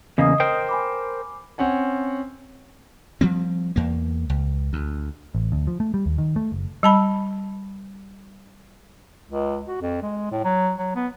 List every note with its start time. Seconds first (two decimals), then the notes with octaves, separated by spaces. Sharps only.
0.18 E2 C#3 A#3 D#5 D#6
0.40 A#4 C5 G5
0.69 G#5 B5 D6
1.58 C4 C#4 F#5 G#5
3.21 F3 G3 C4
3.76 E2 A#3
4.30 C#2
4.73 D2
5.35 A1
5.52 D2
5.67 F3
5.80 A3
5.94 G3
6.06 D#2
6.18 D#3
6.36 A3
6.52 F#1
6.83 G3 A5 B5
9.30 C#2
9.67 F#4
9.81 F2
10.02 G#3
10.31 A2
10.44 F#3
10.78 F#3
10.95 B3